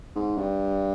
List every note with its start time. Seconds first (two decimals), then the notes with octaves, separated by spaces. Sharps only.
0.16 G#2
0.37 G2